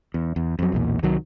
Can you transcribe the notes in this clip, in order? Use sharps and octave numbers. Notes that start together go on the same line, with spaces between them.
E2
E2
F2 F#3
B1 E2 A#2
C2 D#3 F#3